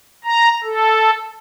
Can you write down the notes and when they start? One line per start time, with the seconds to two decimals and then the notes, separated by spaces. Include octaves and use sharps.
0.24 A#5
0.64 A4